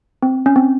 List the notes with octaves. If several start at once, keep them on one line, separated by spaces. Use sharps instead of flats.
C4
C#4
C4